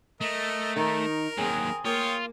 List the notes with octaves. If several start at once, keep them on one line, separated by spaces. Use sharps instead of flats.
A3 A#4 D#5
D#3 D#4 A#4
D#2 F#3 C4 G#4
A#3 F4 C#5 G5 D#6